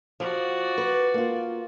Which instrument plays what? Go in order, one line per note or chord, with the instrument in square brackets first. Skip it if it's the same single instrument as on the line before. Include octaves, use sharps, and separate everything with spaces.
[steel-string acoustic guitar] F3 [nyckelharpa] F#4 D5
[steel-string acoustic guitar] B4
A#3 F4